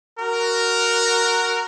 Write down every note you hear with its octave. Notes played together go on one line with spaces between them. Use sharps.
F#4 A#4